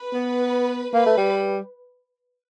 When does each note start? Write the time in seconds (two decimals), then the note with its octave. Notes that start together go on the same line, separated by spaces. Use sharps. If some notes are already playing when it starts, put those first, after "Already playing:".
Already playing: B4
0.14 B3
0.94 A#3 B4
1.06 A3
1.18 G3